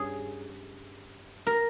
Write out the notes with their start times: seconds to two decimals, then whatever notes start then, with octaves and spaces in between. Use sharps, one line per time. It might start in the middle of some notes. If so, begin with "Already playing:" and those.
Already playing: G2 C#4 G#4
1.47 A#4